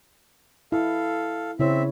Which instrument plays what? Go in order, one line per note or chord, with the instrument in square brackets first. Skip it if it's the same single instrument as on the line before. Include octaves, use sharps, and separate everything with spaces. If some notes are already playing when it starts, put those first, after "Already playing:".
[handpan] E4 [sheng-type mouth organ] A4 F5
[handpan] C#3 E4 C#5 [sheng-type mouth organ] C4 E5